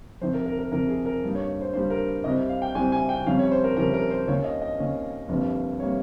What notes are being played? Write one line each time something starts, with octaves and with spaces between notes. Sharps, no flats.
F2 C3 D#3 C5
A#4
A#4
A#4
F2 C3 D#3 A#4
G#4
A#4
G2 G3 A#3 D#4
C#5
C5
G2 G3 A#3 D#4 C5
A#4
C2 C3 G3 C4 D#5
F5
G5
C2 C3 G3 C4 G#5
G#5
G5
F2 C3 D#3 G3 C#4 F5
C#5
C5
A#4
F2 C3 D#3 G3 C#4 A#4
A#4
C5
D#2 D#3 A#3 C#4 C#5
D#5
D#5
D#2 D#3 A#3 C#4
G1 F2 C3 G3 A#3
C3 G3 A#3 C#5